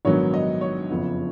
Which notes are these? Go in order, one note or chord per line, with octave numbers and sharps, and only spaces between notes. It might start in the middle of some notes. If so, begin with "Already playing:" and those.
A#1 G#2 D#3 F#3 B3 C#5
D#5
C#5
F#1 F2 F3 B3